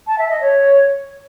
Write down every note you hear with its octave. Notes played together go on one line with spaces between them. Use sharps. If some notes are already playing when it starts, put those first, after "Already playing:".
A5
E5
D#5
C#5